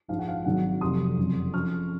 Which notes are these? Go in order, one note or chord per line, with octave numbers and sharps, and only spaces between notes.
A#1 G#2 F3 F5
F#5
F5
G#1 G#2 F#3 F#5
F1 F2 C3 F#3 C6 D#6
F#1 F2 D#3 F#3
F2 C#3 F3 C#6 F6